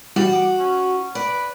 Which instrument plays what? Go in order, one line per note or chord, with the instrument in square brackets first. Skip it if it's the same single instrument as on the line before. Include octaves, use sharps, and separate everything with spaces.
[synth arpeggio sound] E3 G3 [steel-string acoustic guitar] F#4
[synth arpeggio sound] D6
[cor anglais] C#4
[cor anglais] B4 [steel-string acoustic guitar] D5